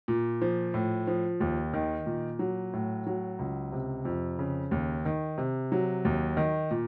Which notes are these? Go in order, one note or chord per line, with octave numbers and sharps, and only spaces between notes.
A#2
F3
A2
F3
D#2
D#3
A#2
F#3
A2
F#3
C#2
C3
F2
C#3
D#2
D#3
C3
F#3
D#2
D#3
A#2